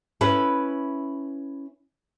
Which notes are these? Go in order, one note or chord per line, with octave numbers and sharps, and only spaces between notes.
C#4 E4 B4